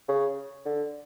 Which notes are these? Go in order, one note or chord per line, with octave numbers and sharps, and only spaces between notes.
C#3
D3